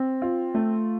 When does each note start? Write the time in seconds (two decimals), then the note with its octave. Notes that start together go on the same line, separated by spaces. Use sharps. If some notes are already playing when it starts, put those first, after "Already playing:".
Already playing: C4
0.22 F4
0.54 A3